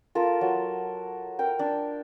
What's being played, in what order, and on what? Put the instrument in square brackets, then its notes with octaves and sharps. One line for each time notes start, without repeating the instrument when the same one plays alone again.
[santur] F4 A4 A#4
F#3
A#4 G5
D4